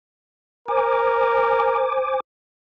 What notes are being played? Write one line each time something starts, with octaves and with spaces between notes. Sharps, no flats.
A#4 C5 G#5 D6